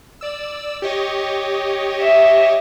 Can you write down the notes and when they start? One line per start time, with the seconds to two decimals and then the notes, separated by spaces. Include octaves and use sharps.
0.21 D5 E6
0.82 G4 C#5 D#5
2.01 E5